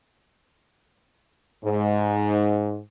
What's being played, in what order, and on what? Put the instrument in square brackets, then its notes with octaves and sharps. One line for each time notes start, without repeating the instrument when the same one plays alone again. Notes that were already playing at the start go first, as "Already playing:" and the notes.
[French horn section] G#2